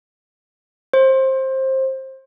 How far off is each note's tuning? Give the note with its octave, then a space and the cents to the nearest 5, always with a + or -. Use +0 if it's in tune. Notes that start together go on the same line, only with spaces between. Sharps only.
C5 +20